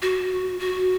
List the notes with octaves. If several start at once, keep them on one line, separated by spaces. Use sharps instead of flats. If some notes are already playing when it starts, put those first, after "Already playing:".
F#4
F#4